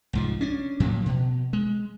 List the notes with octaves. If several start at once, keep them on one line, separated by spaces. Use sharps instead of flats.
C2 G#2 F3
C#4 D4
A2 F3 F#3 A#3
B2
G#3